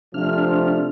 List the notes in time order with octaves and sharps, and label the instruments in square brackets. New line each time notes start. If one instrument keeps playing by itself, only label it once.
[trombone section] C3 F3 A3 [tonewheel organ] D4 F6